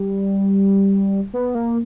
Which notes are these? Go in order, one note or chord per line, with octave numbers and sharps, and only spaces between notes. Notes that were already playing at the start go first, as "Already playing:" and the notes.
Already playing: G3
B3
A#3